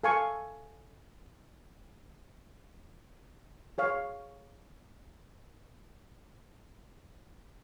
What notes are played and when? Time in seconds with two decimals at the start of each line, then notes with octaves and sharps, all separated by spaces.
0.04 A4 F5 G#5 C#6
3.78 G#4 C#5 F5